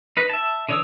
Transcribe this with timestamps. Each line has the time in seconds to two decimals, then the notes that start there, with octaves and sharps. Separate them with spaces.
0.17 D#4 B4
0.30 E5 A5
0.69 D3 E3 C#5 D#6 E6